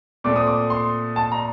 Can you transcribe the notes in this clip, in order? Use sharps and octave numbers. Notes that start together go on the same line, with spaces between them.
A#2 A3 C4 D6
D#6
D6
C6
A5
A#5